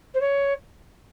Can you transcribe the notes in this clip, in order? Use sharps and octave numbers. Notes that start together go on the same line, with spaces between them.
C5
C#5